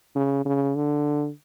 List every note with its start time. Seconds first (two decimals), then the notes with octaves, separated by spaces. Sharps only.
0.15 C#3
0.45 C#3
0.76 D3